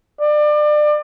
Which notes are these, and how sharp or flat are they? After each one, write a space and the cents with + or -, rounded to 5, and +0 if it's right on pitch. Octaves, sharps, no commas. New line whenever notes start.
D5 +30